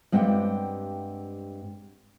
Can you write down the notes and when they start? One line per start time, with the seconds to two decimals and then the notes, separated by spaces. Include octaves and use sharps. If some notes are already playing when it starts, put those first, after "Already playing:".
0.12 G2 G#3 C4 G4 F#5 G5